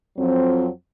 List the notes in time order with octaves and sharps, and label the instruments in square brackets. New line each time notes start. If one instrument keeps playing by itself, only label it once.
[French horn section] F2 F3 F#3 C4